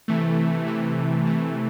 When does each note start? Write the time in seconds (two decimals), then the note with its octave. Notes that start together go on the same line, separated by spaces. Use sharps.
0.08 C3 E3 A3
0.67 C3 E3 A3
1.27 C3 E3 A3